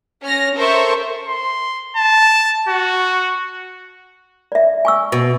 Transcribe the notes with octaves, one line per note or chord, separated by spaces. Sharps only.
C#4 F6 A#6
A4 A#4 C5 E5 C#6
C6
A5
F#4
D5 E5
G#5 C#6 E6
B2